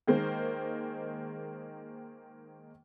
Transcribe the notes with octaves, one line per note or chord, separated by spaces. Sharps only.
D#3 G#3 A#3 C5